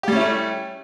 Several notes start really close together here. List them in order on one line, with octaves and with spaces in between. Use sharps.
G4 G3 C#4 E4 A3